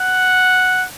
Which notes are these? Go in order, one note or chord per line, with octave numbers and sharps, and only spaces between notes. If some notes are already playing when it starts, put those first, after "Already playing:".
Already playing: F#5